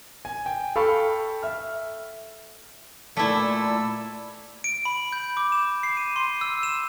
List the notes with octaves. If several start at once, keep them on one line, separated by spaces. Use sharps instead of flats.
G#5
G5
A4 F5 G5 B5 C#6
E5 F6
A#2 A3 E4 D5 E6
D7
B5
G6
D6
E7
C7
D#7
C6
E6
E7